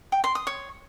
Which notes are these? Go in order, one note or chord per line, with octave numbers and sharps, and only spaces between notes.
G5
C6
D#6
C#5